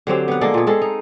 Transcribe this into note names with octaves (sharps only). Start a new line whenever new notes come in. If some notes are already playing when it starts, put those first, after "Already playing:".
D3 F#3 C4 G4
B3 F#5
G#3 A#3 A4 D5
A#2 B3
G#3 C4 A4
D#4